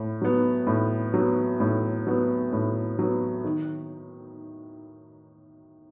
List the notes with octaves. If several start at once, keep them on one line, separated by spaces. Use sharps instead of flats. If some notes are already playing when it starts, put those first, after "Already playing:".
Already playing: A2
F#3 B3
A2
F#3 B3
A2
F#3 B3
A2
F#3 B3
D#3